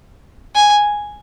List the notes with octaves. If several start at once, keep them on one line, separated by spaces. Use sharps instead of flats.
G#5